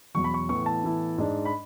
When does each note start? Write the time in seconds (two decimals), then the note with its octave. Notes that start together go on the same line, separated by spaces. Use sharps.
0.15 E2 B2 F#3 C#6
0.24 B5
0.34 C#6
0.49 A2 E3 B3 E4 C#6
0.66 A5
0.83 A2 E3 B3 E4
1.18 G#2 G#3 D4
1.45 B5